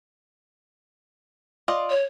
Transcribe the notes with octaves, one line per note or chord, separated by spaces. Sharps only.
F4 D5 D#5
C#5